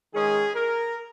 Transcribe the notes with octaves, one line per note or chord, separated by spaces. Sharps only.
D#3 G#3 C#4 G#4
A#4